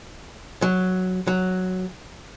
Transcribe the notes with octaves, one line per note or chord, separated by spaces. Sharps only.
F#3
F#3